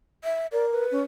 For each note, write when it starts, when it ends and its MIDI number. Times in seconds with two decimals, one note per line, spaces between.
0.24 0.47 76
0.52 0.85 70
0.52 0.66 74
0.71 0.98 71
0.91 1.03 61